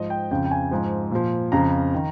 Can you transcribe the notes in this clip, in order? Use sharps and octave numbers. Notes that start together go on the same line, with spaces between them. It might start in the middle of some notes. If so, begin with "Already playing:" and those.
Already playing: G#2 F3 D#5
G5
F2 C#3 F3 G5
G5
G#5
G#2 F3
A#2 F3
F2 C#3 F3 A#5
D#3